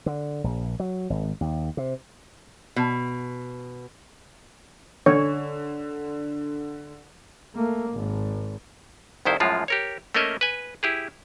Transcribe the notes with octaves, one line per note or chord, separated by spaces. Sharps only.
D3
A#1
F#3
G#1
D#2
C3
B2
D3 C#5
A3 A#3
G#1
C2 F2 D#3 E4 C5
F#2 A2 F3 G#3 F4
G4 A#4 C#5
A3 A#3 C#4 A#4 D#5 E5
B4 G#5
E4 G4 G#4